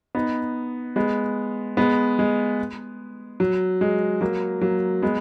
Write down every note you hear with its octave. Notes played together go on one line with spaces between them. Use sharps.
B3 D#4
G#3 B3
G#3 B3
G#3
F#3
G#3
F#3 A#3
F#3 A#3
G#3 B3